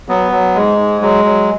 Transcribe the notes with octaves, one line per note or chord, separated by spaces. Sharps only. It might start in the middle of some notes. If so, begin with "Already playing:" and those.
F#3 B3
F#3
G#2 G#3
G#2
F#3 G#3
F#3